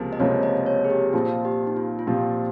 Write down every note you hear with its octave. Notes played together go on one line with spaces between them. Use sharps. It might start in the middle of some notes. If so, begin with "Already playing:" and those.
Already playing: C#2 C3 F3 A#3
D#5
C#2 C3 F3 A#3 C#5
D#5
C#5
G#4
G4
A#2 F3 C4 F4
G4
D#4
F4
F4
A#2 F3 C4 G4